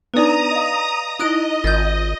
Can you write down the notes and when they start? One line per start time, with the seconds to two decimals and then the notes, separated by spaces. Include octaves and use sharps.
0.14 B3 D4 D#4 B4 D5 A#5 D#6
0.51 D#5 F5
1.19 D#4 E4 D#5 D#6 F#6 D7
1.64 G#1 F4 A#4 G6 A6